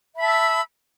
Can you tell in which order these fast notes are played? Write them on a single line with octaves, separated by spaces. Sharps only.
E5 B5 A5 E6